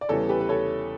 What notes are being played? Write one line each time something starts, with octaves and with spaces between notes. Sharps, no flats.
D5
E2 C#3 E3 G3 A4 C#5
G4 B4
B4
A4 C#5